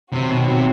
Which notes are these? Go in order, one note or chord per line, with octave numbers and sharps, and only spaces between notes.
C3 D#3 F#3 C4 F#4
B2
C3